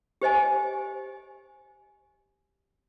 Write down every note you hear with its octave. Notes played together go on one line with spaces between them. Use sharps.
G4 C5 D#5 G#5